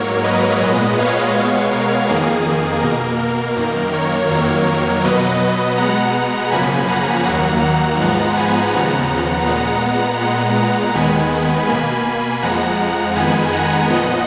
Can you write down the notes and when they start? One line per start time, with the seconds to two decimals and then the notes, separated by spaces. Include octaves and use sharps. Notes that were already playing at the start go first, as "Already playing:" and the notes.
Already playing: G#2 F#3 A#3 A#4 C#5
0.24 B4 D#5
0.61 A#2 G#3 B3
0.98 C#5 F5
1.35 B2 G#3 B3
1.72 A#4
2.09 F2 D#3 A#3 G#4
2.82 B2 A#3 A#4
3.56 F#2 D#3 A#3
3.93 A#4 C#5
4.30 F2 D#3 F#3 A#3
5.04 B2 F#3 B3 B4 D#5
5.77 B2 G#3 B3 F#5 A#5
6.51 F#2 C#3 F3 A#3 G#5 B5
6.88 F#5 A#5
7.25 D#2 D#3 F#3 A#3 F#5 A#5
7.62 F#5 A#5
7.99 G#2 F3 G#3 B3
8.36 G#5 B5
8.72 D#2 C#3 F3 B3 F#5 A#5
9.46 A#2 G#3 B3 F#5 A#5
10.21 A#2 G#3 B3 F#5 A#5
10.57 F#5 A#5
10.95 D#2 D#3 G#3 B3 G#5 B5
11.68 B2 A#3 G#5 B5
12.43 F2 F3 G#3 F#5 A#5
13.15 F2 D#3 G#3 B3 G#5 B5
13.53 F#5 A#5
13.89 A#2 F3 B3 D#5 F#5